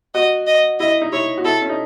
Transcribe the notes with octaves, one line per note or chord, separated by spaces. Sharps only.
F#4 D#5
D#5
E4 D#5
D#4
E4 C#5
F#4
E4 A4
C#4
D#4